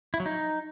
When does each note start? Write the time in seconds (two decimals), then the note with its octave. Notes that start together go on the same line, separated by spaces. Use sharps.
0.14 E4
0.20 F#3
0.26 D#4